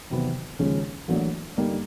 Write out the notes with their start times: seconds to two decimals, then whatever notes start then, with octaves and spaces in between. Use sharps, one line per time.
0.10 E2 C3 D#3 F#3 B3
0.59 D#2 C#3 F3 G#3 C#4
1.08 A1 A2 F#3 A#3 D4
1.57 G2 D3 G3 A#3 D#4